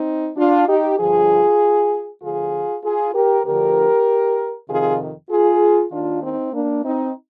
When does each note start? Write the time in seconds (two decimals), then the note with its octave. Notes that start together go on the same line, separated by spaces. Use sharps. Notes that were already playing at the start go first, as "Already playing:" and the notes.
Already playing: C4 D#4
0.37 D4 F4
0.69 D#4 G4
0.99 G2 D3 F3 F4 G#4
2.22 D2 D3 F3 F4 G#4
2.84 F4 G#4
3.15 G4 A#4
3.45 D2 D3 F3 G4 A#4
4.69 F2 C3 D#3 F4 G#4
5.30 F4 G#4
5.92 D#2 D#3 D4 F4
6.23 C4 D#4
6.53 A#3 D4
6.84 C4 D#4